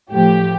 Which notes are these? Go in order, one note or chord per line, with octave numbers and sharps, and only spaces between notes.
A2 F3 G4